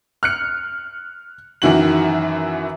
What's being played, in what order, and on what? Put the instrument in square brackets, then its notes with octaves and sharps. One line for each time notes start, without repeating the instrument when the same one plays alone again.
[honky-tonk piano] F6 F#6 C#7
F#2 D#3 E3 F#4 F#7